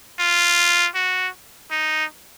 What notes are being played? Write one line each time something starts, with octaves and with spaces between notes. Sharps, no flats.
F4
F#4
D#4